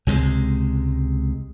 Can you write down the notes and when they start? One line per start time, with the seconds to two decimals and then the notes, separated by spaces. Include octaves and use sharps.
0.07 C#2 C3 F#3 G#3